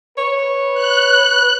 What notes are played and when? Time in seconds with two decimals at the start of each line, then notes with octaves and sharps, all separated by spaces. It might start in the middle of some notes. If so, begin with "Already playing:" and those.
0.18 B4 C#5
0.74 F#6